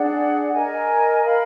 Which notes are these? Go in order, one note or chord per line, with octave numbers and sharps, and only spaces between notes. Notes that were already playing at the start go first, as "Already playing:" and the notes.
Already playing: D4 G#4 D5 F#5
A#4 D#5 G#5
A#4 F5 B5